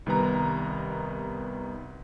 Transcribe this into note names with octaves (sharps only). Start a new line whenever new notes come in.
C2 D#3 G3 B3 B4 A#5